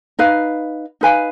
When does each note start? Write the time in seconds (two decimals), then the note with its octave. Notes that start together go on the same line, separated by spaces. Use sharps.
0.19 D#4 B4 F5
1.01 D#4 B4 F5 G#5